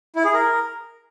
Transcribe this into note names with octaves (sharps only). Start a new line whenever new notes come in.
E4
G#4
A#4